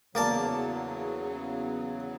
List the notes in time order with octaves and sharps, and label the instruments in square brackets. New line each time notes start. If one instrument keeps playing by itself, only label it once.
[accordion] E2 C#3 F#3 [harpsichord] A#3 D5 A5